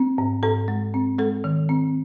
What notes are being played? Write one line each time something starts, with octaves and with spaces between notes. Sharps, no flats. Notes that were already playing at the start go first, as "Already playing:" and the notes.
Already playing: C4
G#2
G#2 A4
G#3
C4
G#3 A4
D#3
C4